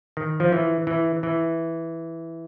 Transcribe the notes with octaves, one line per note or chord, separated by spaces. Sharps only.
D#3
F3
E3
E3
E3